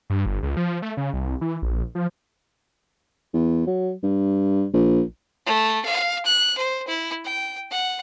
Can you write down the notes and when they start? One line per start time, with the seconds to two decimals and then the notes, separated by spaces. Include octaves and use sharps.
0.10 G2
0.26 G1
0.43 C#2
0.57 F3
0.82 A3
0.97 C#3
1.14 C2
1.41 E3
1.62 A#1
1.95 F3
3.34 E2
3.67 F#3
4.03 G2
4.74 A#1
5.46 A3
5.85 F5
6.25 F#6
6.58 C5
6.87 E4
7.24 G5
7.71 F#5